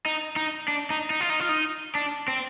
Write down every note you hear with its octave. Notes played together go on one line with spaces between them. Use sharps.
D#4
D#4
D4
D#4
D#4
F4
D#4
F4
D#4
D4
C4